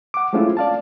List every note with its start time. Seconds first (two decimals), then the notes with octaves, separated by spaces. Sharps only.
0.14 F#5 D6
0.33 G#3 A3 C4 C#4 E4 F4
0.57 D5 F5 A5